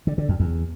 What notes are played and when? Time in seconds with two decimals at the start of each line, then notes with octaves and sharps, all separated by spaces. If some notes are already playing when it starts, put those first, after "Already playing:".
0.07 D3
0.18 D3
0.29 F2
0.40 E2